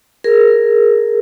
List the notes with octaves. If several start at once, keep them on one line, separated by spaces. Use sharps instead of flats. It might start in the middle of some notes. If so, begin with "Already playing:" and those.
G#4 A#4